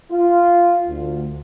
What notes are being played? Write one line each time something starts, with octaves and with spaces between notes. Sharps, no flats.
F4
D2